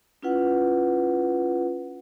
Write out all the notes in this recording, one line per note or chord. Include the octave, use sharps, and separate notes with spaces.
C#4 E4 F4 B4 F#5